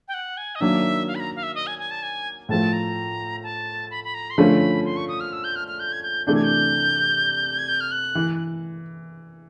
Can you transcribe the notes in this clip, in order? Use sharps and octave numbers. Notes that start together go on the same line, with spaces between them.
G5
F#5
G#5
D#5
D#3 F#3 A#3 D4 E5
F5
B5
A#5
F5
E5
D#5
G#5
G#5
A5
G#5
A2 F3 A3 A5
A#5
A5
B5
B5
A#5
C6
D3 F3 A3 C#4 B5
C6
C#6
D#6
F6
E6
G6
F6
F6
G6
G#6
G6
C3 E3 A3 D4 G6
G#6
G6
G#6
G6
F6
F#6
E3